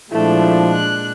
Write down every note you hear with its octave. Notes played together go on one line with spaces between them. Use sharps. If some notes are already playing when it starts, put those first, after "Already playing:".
A#2 F3 G#3 A3 D4 E4
F#6